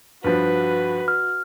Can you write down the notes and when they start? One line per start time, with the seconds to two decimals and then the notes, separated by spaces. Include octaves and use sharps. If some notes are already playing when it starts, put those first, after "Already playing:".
0.24 G2 F3 F#4 B4
1.08 F6